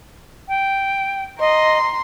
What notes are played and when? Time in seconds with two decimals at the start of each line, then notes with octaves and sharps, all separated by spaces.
0.48 G5
1.40 D#5 A#5 C6